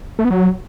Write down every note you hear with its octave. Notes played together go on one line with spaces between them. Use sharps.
A3
B3
F#3